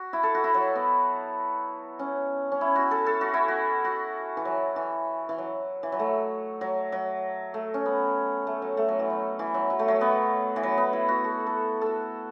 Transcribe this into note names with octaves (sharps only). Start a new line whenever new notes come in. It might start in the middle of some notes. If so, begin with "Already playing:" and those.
Already playing: F#4
E4
A4
F#4
E4
F#3
B3
C#4
C#4
E4
F#4
A4
A4
F#4
E4
F#4
F#4
E3
F#3
E3
E3
F#3
E3
F#3
A3
F#3
F#3
A3
C#4
B3
A3
F#3
A3
F#3
E3
F#3
E3
F#3
F#3
A3
F#3
B3
E3
F#3
B3
E4
F#4
A4
A4
F#4 A4